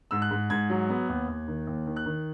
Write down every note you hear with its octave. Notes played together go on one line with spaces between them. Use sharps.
G#2 E6
F#6
G#2
G#2 G#6
F#3
B3
D#2
D#2
D#3
D#2
D#3
F#6
D#3